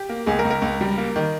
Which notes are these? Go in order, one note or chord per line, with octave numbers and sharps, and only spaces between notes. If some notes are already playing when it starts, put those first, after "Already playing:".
Already playing: G4
A#3
C#2 G#4
A#4
C#2
A#4
C#2
G3
A#3
D#3